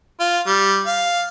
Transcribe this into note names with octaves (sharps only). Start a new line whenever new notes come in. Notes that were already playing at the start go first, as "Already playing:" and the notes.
F4
G3
F5